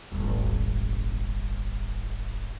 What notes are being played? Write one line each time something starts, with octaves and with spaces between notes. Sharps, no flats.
D#1 G#1